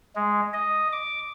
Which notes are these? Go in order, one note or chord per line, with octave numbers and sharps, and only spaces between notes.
G#3
D#5
D6